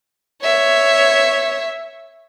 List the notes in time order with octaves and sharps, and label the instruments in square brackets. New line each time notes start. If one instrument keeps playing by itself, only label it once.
[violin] C#5 E5